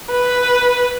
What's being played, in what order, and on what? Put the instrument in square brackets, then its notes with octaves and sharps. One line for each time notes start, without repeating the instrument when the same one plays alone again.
[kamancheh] B4